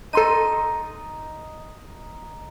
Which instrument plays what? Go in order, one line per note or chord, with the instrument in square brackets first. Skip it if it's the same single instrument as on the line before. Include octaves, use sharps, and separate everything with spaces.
[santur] D#4 [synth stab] A4 C6 D#7